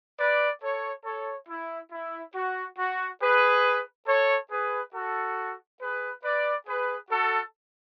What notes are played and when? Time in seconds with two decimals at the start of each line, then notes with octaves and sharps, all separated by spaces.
0.19 B4 D5
0.62 A4 C#5
1.05 A4 C#5
1.49 E4
1.92 E4
2.35 F#4
2.78 F#4
3.22 G#4 B4
4.08 A4 C#5
4.51 G#4 B4
4.94 F#4 A4
5.81 G#4 B4
6.24 B4 D5
6.67 G#4 B4
7.10 F#4 A4